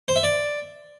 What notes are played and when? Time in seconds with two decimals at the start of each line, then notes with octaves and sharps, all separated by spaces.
0.08 C5
0.16 E5
0.23 D5